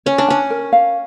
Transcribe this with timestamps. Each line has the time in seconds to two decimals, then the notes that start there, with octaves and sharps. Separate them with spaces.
0.06 C#4 C#5
0.18 D4
0.28 C#4 G#5
0.50 A#4
0.73 F5